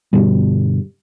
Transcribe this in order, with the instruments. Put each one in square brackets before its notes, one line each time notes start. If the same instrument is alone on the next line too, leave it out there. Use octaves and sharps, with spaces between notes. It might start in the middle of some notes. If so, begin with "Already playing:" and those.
[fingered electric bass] G2 B2 D3 G3